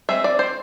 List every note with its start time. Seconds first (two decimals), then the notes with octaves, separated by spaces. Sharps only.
0.09 G#3 C4 E5
0.24 D5
0.39 C5